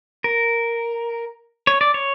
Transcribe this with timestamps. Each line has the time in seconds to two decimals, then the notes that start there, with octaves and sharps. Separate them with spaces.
0.24 A#4
1.67 C#5
1.81 D5
1.94 C#5